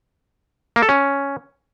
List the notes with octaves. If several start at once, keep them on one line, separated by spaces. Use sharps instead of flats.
A#3
A4
C#4